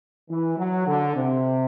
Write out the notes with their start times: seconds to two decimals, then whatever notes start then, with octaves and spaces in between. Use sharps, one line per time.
0.29 E3
0.58 F#3
0.87 D3
1.15 C3